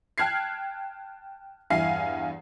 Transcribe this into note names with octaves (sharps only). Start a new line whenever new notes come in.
G5 A5 F6 F#6 G#6 C7
E2 G2 E4 F5 G#5 C7